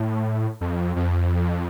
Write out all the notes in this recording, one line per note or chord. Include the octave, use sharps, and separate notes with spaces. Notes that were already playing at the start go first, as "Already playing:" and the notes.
Already playing: A2
F2
F2